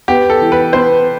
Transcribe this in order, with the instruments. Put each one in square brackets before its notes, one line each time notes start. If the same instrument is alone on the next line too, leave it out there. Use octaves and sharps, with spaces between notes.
[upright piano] B3 [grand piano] G4
[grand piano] A4
[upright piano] E3
[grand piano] B4
[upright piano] B3 [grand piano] C5